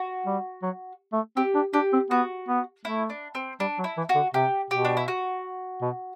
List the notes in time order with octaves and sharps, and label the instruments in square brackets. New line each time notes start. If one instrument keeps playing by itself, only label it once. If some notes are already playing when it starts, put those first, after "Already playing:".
Already playing: [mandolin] F#4
[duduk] G3
F#3
A3
[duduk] C4 [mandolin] G4
[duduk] D4
[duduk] D4 [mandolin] G4
[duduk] C4
[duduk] B3 [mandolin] F#4
[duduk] B3
[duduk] A3 [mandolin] E4
[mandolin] D4
C4
[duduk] G3 [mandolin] D4
[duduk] F#3
[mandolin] E4
[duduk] E3
[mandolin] F#4
[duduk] D3
[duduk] C3 [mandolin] G4
[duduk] B2 [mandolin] G4
[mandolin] D4
E4
F#4
[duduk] B2